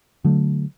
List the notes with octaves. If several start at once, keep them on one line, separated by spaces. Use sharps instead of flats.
D3 F#3 A3